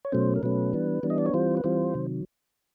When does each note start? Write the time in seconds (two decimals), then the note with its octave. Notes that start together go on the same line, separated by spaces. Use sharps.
0.05 C#5
0.12 B2 F#3 A3 C#4 C5
0.36 A#4
0.43 B2 F#3 A3 C#4 B4
0.73 E3 G3 B3 D4
1.03 E3 G3 B3 D4
1.10 D#5
1.18 D5
1.26 C#5
1.34 E3 G3 C4 F4 C5
1.57 B4
1.64 E3 G3 C4 F4 C5
1.94 C3 D#3 F#3